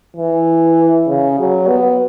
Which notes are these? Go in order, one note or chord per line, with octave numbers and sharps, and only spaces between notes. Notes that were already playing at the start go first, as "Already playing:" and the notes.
E3
C#3
F#3
B3